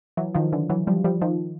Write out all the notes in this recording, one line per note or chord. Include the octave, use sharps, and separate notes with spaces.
E3 F#3
D#3 F3
D3 E3
E3 F#3
F3 G3
F3 G3
D#3 F3